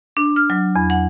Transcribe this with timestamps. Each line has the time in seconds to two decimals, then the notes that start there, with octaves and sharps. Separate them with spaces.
0.17 D4
0.36 F6
0.50 F#3
0.76 E2
0.90 F#5